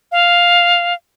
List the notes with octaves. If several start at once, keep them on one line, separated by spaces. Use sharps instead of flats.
F5